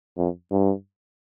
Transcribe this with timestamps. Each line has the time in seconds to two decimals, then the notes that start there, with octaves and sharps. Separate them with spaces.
0.18 F2
0.51 G2